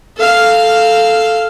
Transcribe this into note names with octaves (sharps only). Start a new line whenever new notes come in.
A4 F5